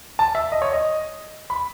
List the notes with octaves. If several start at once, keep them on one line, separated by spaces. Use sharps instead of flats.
A5
E5
D#5
C#5
D#5
B5